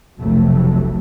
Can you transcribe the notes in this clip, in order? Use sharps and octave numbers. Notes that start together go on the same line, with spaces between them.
F1 B1 F2 C3 F#3 A3